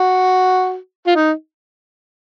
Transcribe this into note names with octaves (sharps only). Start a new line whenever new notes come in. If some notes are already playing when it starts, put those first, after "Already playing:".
Already playing: F#4
F4
D#4